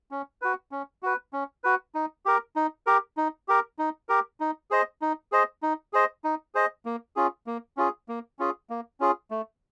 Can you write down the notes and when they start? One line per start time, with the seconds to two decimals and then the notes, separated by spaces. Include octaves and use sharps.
0.11 C#4
0.42 F#4 B4
0.72 C#4
1.03 F#4 B4
1.33 C#4
1.64 F#4 B4
1.95 D#4
2.26 G4 A#4
2.56 D#4
2.87 G4 A#4
3.17 D#4
3.48 G4 A#4
3.79 D#4
4.09 G4 A#4
4.40 D#4
4.71 G#4 C5 D#5
5.02 D#4
5.32 G#4 C5 D#5
5.63 D#4
5.93 G#4 C5 D#5
6.24 D#4
6.55 G#4 C5 D#5
6.85 A#3
7.16 C#4 F4 G#4
7.47 A#3
7.77 C#4 F4 G#4
8.09 A#3
8.39 C#4 F4 G#4
8.70 A#3
9.00 C#4 F4 G#4
9.31 A3